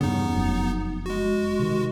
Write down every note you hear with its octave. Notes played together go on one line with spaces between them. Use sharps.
E2 G2 C#3 B3 D#4
F1 F#2
G#3 F#4
C3 D#3